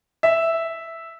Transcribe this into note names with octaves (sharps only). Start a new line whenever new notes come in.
E5